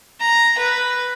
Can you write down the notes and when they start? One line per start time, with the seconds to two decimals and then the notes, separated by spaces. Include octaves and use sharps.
0.20 A#5
0.58 B4